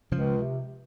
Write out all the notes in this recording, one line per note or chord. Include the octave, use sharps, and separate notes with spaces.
C#2 C#3 F3
C3